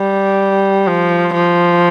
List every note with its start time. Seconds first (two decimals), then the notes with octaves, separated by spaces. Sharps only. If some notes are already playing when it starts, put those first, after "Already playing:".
Already playing: G3
0.87 F3
1.35 F3